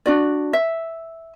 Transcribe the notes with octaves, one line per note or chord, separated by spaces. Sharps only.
D4 F#4 D5
E5